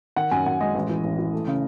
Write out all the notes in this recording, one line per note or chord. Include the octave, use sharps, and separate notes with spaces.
D#3 F#5
F#2 G#5
F#2 F#5
G#3 D#5
A1
E3
A1
E3
A3
C#3